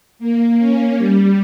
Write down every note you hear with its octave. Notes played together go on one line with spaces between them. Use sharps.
A#3
C#4
G3